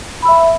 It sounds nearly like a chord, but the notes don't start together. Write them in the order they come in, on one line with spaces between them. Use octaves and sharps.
B5 E6 E5